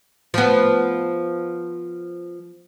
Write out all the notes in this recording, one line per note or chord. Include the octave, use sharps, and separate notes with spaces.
F3 B3